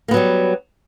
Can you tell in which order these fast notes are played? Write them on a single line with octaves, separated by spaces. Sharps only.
A#3 B3 F#3 G3